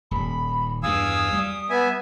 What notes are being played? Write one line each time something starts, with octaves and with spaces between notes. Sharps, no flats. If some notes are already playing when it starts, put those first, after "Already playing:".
D#1 B5
E2 G2 F5 G#5 D#6 E6
G3
B3 E5 G#5